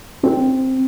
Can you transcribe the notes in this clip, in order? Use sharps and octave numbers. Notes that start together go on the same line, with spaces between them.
C4